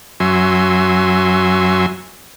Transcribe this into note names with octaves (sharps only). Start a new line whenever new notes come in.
F#2 F#3 E5 G#5 C6